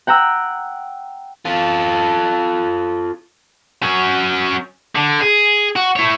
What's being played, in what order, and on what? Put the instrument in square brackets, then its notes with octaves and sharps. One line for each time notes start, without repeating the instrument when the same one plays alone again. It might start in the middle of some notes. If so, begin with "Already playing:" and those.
[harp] F#5 G5 A#5 E6
[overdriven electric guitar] F4 A4
[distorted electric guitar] F#3 C#4
D3
G#4
F#4
E4 C#5